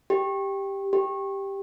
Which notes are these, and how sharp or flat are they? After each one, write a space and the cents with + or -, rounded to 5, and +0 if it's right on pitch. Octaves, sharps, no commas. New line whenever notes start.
G4 +5
G4 +5